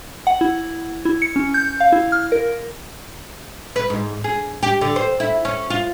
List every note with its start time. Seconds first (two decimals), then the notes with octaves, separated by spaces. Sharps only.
0.27 F#5
0.41 E4
1.05 E4
1.22 C#7
1.36 C#4
1.54 G6
1.80 F5
1.92 E4
2.12 F6
2.32 A#4
3.76 B4
3.90 G#2
4.24 G#4
4.63 G4
4.81 D3
4.96 C5
5.20 E4
5.45 C#4
5.70 F4